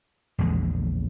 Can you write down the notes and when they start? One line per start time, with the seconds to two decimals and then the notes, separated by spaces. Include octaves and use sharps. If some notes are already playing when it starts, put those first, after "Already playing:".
0.39 A#1 E2 D3 G#3